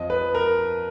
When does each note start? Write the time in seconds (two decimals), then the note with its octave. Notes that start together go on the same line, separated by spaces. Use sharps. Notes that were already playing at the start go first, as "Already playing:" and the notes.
Already playing: F2 F3 D#5
0.10 B4
0.35 A#4